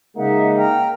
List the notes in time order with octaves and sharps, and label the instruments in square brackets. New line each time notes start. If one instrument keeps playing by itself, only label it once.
[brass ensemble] C#3 G#3 D#4 [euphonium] A#3 [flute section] E5 F#5
[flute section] G5 A#5 F6